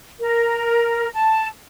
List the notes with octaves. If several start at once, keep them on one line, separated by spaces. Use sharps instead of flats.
A#4
A5